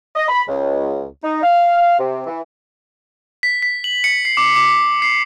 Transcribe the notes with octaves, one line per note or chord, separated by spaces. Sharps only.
D#5
B5
C#2
D#4
F5
C3
E3
B6
B6
F#7
C#7
C7
D6
D6
C7